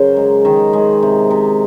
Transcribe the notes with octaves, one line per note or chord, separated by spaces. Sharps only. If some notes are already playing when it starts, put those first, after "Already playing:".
Already playing: C#3 F#3 A#4 C5
G#3
D#3
G#3
C3
C3